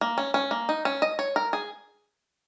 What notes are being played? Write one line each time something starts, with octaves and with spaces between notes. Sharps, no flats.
A#3
C#4
C#4
A#3
D#4
C#4
D#5
C#5
A#4
G#4